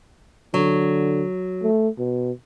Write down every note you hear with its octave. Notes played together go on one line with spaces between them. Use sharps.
D3 F#3
A3
B2